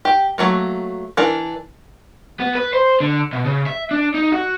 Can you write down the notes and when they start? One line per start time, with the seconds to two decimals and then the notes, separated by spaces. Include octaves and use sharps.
0.05 G4
0.38 F#3 A3 A#3
1.17 E3 D4 A#4
2.40 B3
2.55 B4
2.73 C5
3.01 D3
3.33 B2
3.45 C#3
3.67 E5
3.91 D4
4.15 D#4
4.33 F#4